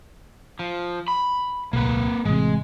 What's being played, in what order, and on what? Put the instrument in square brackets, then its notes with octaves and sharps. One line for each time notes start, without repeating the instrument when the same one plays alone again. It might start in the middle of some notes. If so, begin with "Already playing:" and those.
[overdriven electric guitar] F3
B5
[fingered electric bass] D1 B1 [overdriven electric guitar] A#3 B4
[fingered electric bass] A1 C3 [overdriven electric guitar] G#3